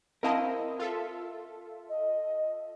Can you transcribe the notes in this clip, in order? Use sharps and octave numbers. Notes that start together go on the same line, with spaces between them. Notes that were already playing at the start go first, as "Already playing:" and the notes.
C4 E4 A#4 D#5 F5 A5
F4 A4 E5
D#5